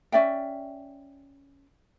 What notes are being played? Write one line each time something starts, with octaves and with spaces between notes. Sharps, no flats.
C#4 D5 E5 G5